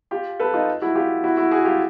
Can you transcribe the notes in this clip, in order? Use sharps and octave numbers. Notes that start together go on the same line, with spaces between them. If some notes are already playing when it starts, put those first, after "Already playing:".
F4 G4
A4 B4
D#4 F4
E4 F#4
F4 G4
E4 F#4
E4 F#4
F#4 G#4
F4 G4